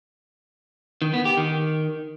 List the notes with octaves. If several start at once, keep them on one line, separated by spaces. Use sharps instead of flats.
D#3
B3
G4
D#3